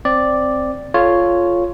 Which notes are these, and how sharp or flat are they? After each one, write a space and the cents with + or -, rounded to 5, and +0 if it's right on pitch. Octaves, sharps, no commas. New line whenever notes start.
C4 +0 D5 +0
F4 +0 A4 -20 C#5 +0